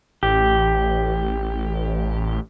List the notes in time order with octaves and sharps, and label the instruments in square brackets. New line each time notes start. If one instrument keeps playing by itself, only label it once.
[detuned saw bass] A1 [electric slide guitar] G4